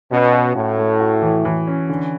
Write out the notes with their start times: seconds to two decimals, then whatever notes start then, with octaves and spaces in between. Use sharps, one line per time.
0.10 B2 C#4
0.33 F#4
0.55 A2 F#4
0.78 A3
1.00 F#4
1.22 E3
1.45 E3
1.67 C#4
1.89 D3